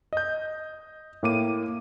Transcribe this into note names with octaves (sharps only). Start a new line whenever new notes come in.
D#5 G6
A2 A#3 D6 D#7